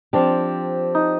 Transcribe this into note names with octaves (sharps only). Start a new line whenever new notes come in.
F3 C4 D4 G4
D#4